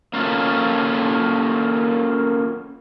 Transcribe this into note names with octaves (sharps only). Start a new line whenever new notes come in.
A#3 C#4 F4 A4 C#5